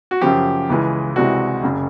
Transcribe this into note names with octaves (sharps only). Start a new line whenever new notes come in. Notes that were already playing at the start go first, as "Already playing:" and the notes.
F#4
F#2 C#3 F3 G4
C#2 C#3 E3 G#3
C2 C3 E3 G#3 F#4
F#1 F#2 C#3